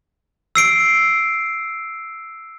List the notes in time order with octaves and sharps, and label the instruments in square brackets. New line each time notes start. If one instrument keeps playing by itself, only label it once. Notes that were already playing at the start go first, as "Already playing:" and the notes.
[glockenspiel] E6 C7 D7